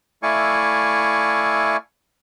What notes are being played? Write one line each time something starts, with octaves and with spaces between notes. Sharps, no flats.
A3 E4 D5 F5 G#5 C#6